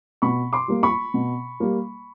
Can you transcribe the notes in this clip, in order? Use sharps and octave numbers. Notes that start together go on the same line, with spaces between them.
B2 B5 C#6
C6 D6
G3 A#3
B5 C#6
B2
G3 A#3